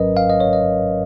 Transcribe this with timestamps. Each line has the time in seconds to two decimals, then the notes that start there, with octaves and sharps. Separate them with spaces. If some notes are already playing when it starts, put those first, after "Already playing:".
Already playing: G#1 G#2 F#3 C#4 A#4 B4 D#5
0.17 F5
0.29 D#5
0.40 C#5
0.53 D#5